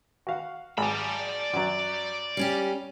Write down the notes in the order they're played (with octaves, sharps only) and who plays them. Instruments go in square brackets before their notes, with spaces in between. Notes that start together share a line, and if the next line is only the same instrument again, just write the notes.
[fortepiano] F#4 F5 F#5
[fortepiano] G#1 [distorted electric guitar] D5 B5
[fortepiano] F#2 F#3
[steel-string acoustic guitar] G3 C#4 G4